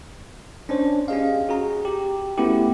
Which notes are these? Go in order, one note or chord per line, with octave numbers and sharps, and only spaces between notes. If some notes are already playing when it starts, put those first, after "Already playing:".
C#4 D4 C5 C#5
C#4 G4 G#4 D#5 F5
F#4 G#4 A#5
G4
A3 B3 C#4 E4 F#4 G4